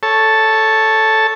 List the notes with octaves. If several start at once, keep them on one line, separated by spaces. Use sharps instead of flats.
A4 C#5 A5